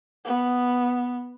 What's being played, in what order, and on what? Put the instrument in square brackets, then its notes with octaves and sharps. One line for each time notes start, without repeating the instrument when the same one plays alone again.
[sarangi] B3